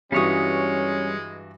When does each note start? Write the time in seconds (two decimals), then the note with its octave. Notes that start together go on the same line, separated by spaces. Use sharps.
0.12 G2 E3 G3 G#3 C#4 F#4 C#5 D#6